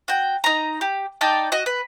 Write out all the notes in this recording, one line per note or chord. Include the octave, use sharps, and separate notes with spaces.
F#4 G5
D#4 A#5
G4
D#4 D5 G5 A5
F#4 D#5
B4